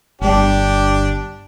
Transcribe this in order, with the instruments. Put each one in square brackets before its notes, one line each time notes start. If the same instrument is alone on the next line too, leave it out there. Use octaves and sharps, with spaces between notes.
[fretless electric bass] G1 G3 [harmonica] D4 G4